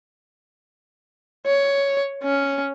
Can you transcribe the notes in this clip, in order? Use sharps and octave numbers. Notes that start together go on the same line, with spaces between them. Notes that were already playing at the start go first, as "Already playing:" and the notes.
C#5
C#4